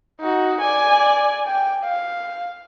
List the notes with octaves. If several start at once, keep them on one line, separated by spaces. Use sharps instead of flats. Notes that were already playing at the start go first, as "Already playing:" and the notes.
D#4 F#4
D5 G#5
G5
F5